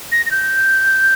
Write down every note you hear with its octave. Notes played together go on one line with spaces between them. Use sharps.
A#6
A#6
G6